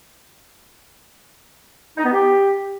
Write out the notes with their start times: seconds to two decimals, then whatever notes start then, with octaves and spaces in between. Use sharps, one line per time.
1.97 D#4
2.04 B3
2.12 G4